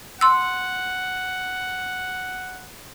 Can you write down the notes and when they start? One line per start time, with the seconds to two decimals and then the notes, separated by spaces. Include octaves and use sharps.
0.21 F#5 C6 E6